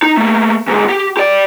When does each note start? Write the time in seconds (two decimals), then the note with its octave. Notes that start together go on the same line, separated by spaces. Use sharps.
0.02 D#4
0.17 A3 A#3
0.67 E2 G#2
0.89 G4
1.17 G4 D5